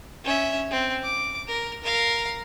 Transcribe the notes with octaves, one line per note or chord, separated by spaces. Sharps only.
C#4 E5
C4
D6
A#4
A#4 F5